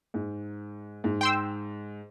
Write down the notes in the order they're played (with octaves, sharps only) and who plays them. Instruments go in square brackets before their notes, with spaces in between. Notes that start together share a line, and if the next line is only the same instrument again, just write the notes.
[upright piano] G#2
G#2
[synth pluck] G5 C6 E6